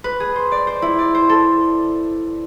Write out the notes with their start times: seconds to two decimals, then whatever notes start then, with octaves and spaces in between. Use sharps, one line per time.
0.04 B4
0.20 G#4
0.36 C5
0.52 D5
0.67 C5
0.82 E4
0.98 D5
1.15 C5
1.29 A4